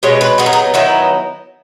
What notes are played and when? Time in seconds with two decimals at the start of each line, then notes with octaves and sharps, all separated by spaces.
0.03 B2 G#3 C#4 C#5
0.21 B4
0.38 F#3 B3 D#4 G#4
0.46 A#4
0.53 G#4
0.74 D#3 F#3 B3 D#4 E4